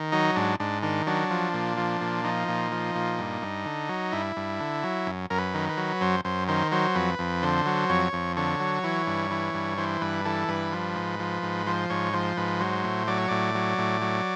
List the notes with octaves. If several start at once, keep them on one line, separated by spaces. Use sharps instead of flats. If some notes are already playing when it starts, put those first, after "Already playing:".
Already playing: D#3
F#3 D#4
G#2 D4
G#2 D4
D#3 D4
F#3 D4
F3
A#2
F3
A#2
F3 D#4
A#2
F3
A#2
G2
G2
D3
F#3
G2 E4
G2
D3
F#3
F#2
F#2 A#4
B4
D#3
B4
F#3
F#2 C5
F#2 C5
D#3 C5
F#3 C5
F2 B4
F2
D3 C5
F#3
F2 C#5
F2
D3 C#5
F#3
E3
G2
E3
G2
E3 C5
G2 B4
E3 A4
G2 B4
F3
G#2
F3
G#2
F3 C5
G#2 C#5
F3 C5
G#2 B4
F#3 C5
A2
F#3 D5
C#5
A2 D5
F#3
A2
F#3